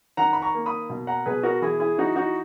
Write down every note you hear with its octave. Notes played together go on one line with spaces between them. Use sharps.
D#3 F#5 A#5
B5
A#5 C#6
A#3
B5 D#6
B2
F#5 A#5
B2 G#4 B4
F#4 A#4
E3 E4 G#4
E4 G#4
E3 D#4 F#4
D#4 F#4